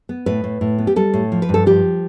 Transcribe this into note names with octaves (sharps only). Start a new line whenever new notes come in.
B3
A2 B4
A2
A2
B3
G4
G3 A4
A2
F3
B4
G2
A4
F3 G4